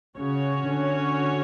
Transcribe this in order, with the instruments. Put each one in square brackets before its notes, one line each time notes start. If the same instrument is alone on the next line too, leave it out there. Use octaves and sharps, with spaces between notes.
[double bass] C#3 [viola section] C#4 F#4 C#5
[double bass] D3